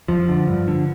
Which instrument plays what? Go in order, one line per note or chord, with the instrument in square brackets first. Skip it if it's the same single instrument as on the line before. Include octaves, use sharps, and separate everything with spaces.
[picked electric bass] F2 F3
D3
G2
D3